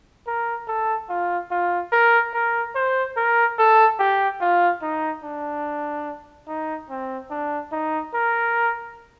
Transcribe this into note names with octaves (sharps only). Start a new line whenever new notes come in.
A#4
A4
F4
F4
A#4
A#4
C5
A#4
A4
G4
F4
D#4
D4
D#4
C4
D4
D#4
A#4